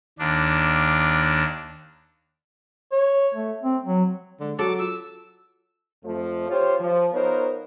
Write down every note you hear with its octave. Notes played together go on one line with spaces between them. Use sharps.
D#2 D4
C#5
A3
C4
F#3
D3 G#3
F#3 F#4 A4 D6
F4 E6
F2 F3 A3
F4 G4 C5 C#5
F3
B3 D#4 F4 A#4 C5 C#5